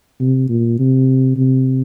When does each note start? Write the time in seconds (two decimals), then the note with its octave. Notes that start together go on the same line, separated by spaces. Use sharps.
0.20 C3
0.49 A#2
0.79 C3
1.36 C3